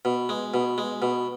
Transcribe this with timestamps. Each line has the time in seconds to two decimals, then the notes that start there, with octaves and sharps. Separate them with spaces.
0.05 B2
0.29 G#3
0.54 B2
0.78 G#3
1.02 B2